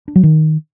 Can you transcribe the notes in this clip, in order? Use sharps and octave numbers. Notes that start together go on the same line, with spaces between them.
D4
F#3
D#3